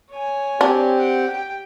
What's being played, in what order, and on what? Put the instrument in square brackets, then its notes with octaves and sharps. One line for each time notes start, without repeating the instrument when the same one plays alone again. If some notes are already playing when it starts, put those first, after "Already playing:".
[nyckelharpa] C#5 G#5
[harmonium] C4 G4 [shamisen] D4
[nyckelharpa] F#5 G5
G4 G5